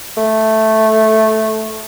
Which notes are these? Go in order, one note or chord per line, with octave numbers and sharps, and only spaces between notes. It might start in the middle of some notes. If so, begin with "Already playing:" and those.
A3